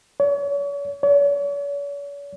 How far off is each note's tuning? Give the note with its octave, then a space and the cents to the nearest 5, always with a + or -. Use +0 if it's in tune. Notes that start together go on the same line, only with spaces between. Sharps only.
C#5 +40
C#5 +45